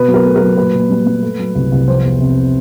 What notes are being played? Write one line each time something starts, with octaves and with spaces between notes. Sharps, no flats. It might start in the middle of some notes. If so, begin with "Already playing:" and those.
Already playing: B2 B4
F#3
A#4
A3
A#4
F#3
A#2 B4
A#2
G3
G3
A3
F#3
C2
C2
F3 C5
E2
C3